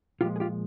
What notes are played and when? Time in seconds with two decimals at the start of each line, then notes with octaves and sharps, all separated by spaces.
0.21 A#2 F3 G#3 F4 G4
0.36 G#4
0.40 F4 G4